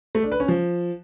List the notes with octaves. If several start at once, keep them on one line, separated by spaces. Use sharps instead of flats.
A3
D4
B4
C#4
F3